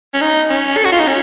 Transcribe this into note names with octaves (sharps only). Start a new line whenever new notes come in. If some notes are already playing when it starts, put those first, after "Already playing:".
C#4
D#4
C#4
A4
F#4
F4
D#4
C#4